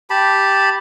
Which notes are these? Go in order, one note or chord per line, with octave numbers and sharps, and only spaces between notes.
G4 A5 B5